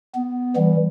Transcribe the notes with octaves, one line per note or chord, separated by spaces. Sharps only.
B3
E3 G3